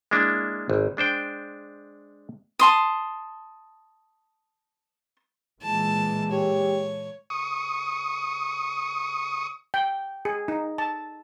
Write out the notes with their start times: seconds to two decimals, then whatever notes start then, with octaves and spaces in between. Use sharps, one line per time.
0.11 G#3 A#3 D4 E4
0.70 G#1
0.97 G#3 D4 C5 G5
2.59 A5 C6 D#6
5.62 A#2 E3 G#3 A5
6.31 G4 C#5
7.30 C#6 D#6
9.74 G5
10.25 G#4
10.48 D#4
10.78 A5